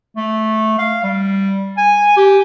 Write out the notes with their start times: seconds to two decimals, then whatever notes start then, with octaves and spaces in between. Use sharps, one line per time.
0.16 A3
0.78 F5
1.03 G3
1.77 G#5
2.17 G4